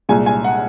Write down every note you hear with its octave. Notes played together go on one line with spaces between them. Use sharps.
C2 A#2 G#3 G#5
G#5
F#5